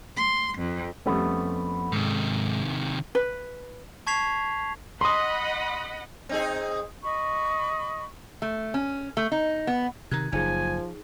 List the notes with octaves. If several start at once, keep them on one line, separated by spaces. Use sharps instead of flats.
C6
F2
F2 G3 A3 B3 C#4
G#2 C3 D#3
B4
A5 C#6 G#6 B6 C7 F7
D#5 F#5 B5 C6 D#6
C4 D#4 G#4
D#5 B5 C#6
A3
C#4
A3
D#4
B3
C3 D#3 A#5 F#6 G#6
F#1 F3 D#4 G#4 G#5